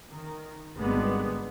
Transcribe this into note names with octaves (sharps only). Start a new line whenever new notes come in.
D#3
G#1 D3 G3 G#3 B3